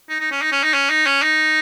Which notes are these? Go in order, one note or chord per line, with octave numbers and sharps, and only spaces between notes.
D#4
D#4
C#4
D#4
C#4
D#4
C#4
D#4
C#4
D#4